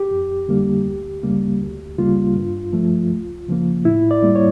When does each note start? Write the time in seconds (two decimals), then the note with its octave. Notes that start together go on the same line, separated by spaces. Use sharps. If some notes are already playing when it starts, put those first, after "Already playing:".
Already playing: G4
0.11 F2
0.48 D3 G3 A#3
0.86 D2
1.23 C#3 G3 A#3
1.61 D2
1.98 C#3 G3 A#3 F4
2.36 G2
2.73 F3 A3
3.11 C#2
3.48 C#3 F3 A#3
3.85 A2 E4
4.11 D5
4.23 G3 A#3
4.36 C#5